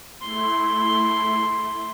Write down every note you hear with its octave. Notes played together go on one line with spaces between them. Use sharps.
A3 E4 C6